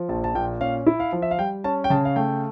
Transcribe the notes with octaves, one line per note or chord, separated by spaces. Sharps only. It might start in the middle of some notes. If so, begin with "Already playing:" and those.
Already playing: F3
A#1 A5
A5
A#2 G5
C#4 F5
E4
F5
F3
E5
F5
G3 G5
C#4 A5
G5
C#3 A5
F5
A3 G5